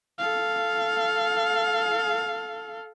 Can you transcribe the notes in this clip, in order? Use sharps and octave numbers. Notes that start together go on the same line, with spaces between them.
A4 F5